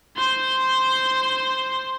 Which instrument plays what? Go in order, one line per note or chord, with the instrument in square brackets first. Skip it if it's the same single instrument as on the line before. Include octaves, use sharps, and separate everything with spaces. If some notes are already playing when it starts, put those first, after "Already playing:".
[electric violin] C5 C6